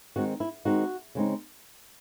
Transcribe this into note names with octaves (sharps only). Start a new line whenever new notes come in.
D#3 G#3 C4 D#4 F#4
E4
D#3 G#3 C4 D#4 F#4
C#3 G#3 C4 D#4